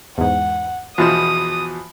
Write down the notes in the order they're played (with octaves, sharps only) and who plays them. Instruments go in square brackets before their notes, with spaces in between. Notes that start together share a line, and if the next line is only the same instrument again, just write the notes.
[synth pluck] E2 G#2 [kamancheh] F#5
[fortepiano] E2 B2 F3 [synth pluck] F4 E7 [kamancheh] D#6